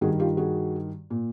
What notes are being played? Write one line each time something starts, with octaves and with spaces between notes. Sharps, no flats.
G2 D#3 F#4 G#4
F4 G4
F#4 G#4
A#2